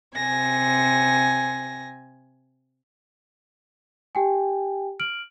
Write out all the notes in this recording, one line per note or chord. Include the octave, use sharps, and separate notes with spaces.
C3 G#5 A#6
G4 G5 G#5
F6 D7 F#7